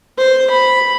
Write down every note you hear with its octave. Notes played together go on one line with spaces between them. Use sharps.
C5
B5